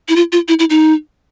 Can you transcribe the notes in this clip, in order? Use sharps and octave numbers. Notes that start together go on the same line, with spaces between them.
E4
F4
F4
E4
E4
D#4